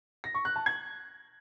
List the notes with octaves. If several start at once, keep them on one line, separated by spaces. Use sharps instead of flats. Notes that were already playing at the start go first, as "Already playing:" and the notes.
A#6
C#6
F#6
A5
G#6